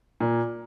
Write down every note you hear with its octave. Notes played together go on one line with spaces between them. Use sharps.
A#2